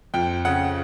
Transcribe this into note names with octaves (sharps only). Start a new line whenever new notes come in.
F2 G5
C#3 F#5